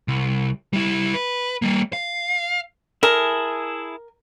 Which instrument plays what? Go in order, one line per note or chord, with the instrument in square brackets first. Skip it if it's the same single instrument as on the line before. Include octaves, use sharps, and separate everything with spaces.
[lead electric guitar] C2
G3 E4
B4
G3 A#3
F5
[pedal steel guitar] E4 G#4 A5 [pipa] A#4